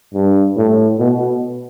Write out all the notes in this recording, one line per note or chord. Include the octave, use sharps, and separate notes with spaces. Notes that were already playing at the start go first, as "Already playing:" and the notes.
G2
A2
B2